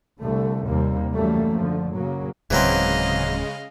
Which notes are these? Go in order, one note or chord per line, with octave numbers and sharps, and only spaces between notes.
C2 D3 A3
D#2 C3 G3 A#3
F#2 E3 G3 A3 A#3
D3 F3
C#3 F#3 A#3
D1 C#3 E3 F#3 G#3 C4 D#5 F5